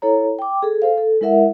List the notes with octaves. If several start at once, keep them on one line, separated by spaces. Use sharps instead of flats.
E4 A4 C#5 A#5
G5 D6
G#4 A4
A4 C5 F5
A4
G#3 E4 A#4 E5 F#5